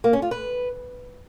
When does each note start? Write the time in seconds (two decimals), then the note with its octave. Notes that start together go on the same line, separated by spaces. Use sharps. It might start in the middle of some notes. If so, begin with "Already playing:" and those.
0.04 A#3
0.13 C#4
0.22 F4
0.31 B4